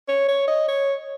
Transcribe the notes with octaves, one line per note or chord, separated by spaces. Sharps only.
C#5
C#5
D#5
C#5